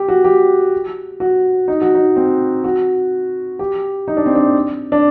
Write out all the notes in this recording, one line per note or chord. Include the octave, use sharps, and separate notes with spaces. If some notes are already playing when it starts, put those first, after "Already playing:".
Already playing: G4
F#4
G4
F#4
D#4
F#4
D#4
C4
F#4
G4
D#4
D4
C4
D4
D4